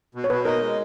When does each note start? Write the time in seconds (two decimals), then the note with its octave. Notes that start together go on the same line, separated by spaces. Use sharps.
0.15 B2
0.24 C#5
0.30 B2 B4
0.45 D#4 A#4
0.61 G#3